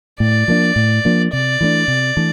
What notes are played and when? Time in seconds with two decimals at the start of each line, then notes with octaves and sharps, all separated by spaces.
0.20 A2 D5
0.48 F3 A#3 D4
0.76 A2
1.05 F3 A#3 D4
1.33 C3 D5
1.61 E3 A3 D4
1.88 C3
2.17 E3 A3 D4